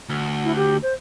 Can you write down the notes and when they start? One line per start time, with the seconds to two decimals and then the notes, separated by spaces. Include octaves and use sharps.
0.09 D2
0.44 E4
0.56 G4
0.82 C5